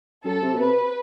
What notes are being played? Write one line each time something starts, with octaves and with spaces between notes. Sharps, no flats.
F#2 A4
C3
B2
C3 B4